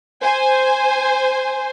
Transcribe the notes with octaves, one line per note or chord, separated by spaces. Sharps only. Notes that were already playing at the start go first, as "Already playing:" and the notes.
C5 G#5